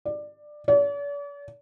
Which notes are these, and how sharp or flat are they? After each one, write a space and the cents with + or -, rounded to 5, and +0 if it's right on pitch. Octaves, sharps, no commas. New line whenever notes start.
D5 +15
D5 -45